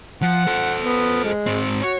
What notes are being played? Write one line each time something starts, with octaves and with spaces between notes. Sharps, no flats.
F3 F#5
A4 C5
B3
G#3
G#2 C4
F#4 C#5